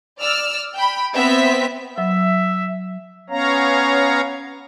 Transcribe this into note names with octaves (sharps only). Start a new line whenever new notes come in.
D5 E6 F6
G5 B5
B3 C4 E5 B6
F#3 E5
B3 C#4 C#5 F5 A#5